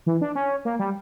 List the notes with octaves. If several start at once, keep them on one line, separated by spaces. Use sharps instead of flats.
E3
D4
C#4
A#3
G3